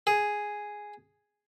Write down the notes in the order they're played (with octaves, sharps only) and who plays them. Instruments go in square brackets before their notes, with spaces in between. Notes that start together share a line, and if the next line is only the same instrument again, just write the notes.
[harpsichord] G#4